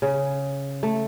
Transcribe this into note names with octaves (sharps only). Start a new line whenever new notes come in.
C#3
A3